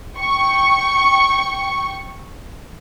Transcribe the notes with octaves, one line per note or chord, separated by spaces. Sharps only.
G5 C#6